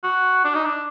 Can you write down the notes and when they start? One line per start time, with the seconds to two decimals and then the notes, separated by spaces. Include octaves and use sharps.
0.03 F#4
0.44 D4
0.55 D#4
0.65 D4